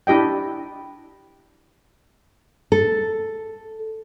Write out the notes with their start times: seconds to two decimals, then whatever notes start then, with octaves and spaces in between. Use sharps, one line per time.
0.07 D4 E4 G4 D#5 G5
2.72 A4